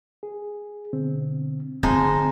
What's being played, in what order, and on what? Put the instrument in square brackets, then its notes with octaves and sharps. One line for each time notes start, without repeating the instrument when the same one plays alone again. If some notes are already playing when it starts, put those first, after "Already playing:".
[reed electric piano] G#4
B2 D3 C4
[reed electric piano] D3 A#5 [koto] F3 G#3 D#4 [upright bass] C4 F4